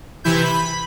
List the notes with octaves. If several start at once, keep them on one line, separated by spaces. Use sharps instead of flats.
C3 E3 E4 G6
B5